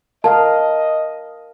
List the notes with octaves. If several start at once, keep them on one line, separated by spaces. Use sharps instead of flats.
A#4 D#5 F5 A5